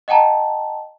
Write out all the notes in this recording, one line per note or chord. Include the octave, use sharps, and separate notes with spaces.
D#5 F#5 G5 A5 A#5